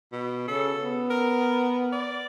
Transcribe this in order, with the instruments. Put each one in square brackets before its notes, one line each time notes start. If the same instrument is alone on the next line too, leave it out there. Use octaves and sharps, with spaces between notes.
[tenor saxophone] B2
[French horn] C#3 [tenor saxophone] A4
[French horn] B3
[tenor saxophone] A#4
D5